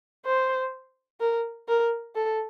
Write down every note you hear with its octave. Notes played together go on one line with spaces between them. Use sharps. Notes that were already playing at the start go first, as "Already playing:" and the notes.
C5
A#4
A#4
A4